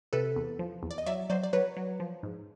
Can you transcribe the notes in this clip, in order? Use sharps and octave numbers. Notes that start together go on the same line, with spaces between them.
C3 A4 B4
E2
F3
E2
D5
D#5
F#3 D5 E5
F#3 C5 D5
D5
F#3 B4 C#5
F#3
F3
G#2